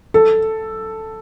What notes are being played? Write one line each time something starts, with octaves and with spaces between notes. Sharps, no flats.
A4